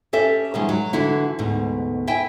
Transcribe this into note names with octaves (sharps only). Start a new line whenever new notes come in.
C#4 G4 A4 E5
B2 D#3 F3 G3 G#3
F#3
D3 E3 E4 F#4
D2 G#2 B2
E4 E5 G5 G#5